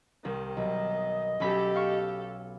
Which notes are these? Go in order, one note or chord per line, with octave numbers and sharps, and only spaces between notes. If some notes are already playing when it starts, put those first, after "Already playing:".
C2 D#3
B1 D#5
B1 C#4 G4 A4 B5
F5 C#6